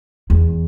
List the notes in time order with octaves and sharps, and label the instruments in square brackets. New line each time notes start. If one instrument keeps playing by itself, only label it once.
[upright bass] E2